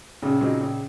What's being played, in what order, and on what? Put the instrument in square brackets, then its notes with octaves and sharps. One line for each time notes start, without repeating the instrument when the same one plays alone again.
[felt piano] A#1 [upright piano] C#3
[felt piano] A#2 F#3 C4 D#4
A#1